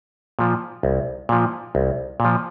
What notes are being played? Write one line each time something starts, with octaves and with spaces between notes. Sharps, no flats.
A#2 F3
C2
A#2 F3
C2
A#2 F3